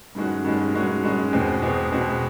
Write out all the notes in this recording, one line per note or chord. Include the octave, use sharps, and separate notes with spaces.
G2 D#3 G#3 C#4 F#4
G2 D#3 G#3 C#4 F#4
G2 D#3 G#3 C#4 F#4
G2 D#3 G#3 C#4 F#4
E2 B2 G#3 C4
E2 B2 G#3 C4
E2 B2 G#3 C4